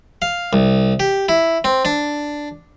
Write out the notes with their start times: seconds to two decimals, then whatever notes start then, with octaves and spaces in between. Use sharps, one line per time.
0.22 F5
0.53 C2
1.00 G4
1.29 E4
1.64 C4
1.85 D4